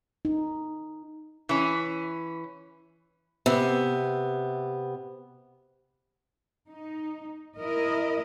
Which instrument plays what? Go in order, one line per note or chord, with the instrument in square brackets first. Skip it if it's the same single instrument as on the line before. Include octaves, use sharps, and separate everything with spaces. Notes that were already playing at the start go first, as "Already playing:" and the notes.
[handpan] D#4
[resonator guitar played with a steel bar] E3 C#4
[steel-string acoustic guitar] C3 B3
[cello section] D#4
E4 A#4 D#5